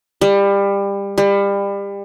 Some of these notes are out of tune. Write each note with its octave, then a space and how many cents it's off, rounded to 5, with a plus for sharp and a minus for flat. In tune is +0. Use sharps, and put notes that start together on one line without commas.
G3 +25
G3 +30